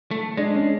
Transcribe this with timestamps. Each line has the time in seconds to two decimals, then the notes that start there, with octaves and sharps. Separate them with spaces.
0.11 A3
0.37 G#3 D4
0.55 C#4